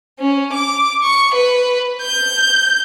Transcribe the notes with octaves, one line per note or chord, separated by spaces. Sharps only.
C#4
D6
C#6
B4
G6